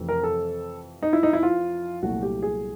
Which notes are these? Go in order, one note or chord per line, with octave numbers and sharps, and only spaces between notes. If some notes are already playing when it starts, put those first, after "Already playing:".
Already playing: F2 C3 E3 A3
A#4
A4
D#4
E4
D#4
E4
F4
C2 A#2 F#3 A3 F#4
G4
G#4